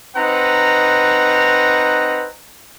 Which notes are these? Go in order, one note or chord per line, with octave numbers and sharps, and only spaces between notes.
C4 D#4 B4 F#5 A#5